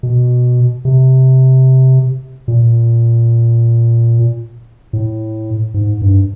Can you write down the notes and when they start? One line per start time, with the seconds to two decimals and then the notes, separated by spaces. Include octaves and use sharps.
0.03 B2
0.85 C3
2.48 A#2
4.93 A2
5.74 G#2
6.02 G2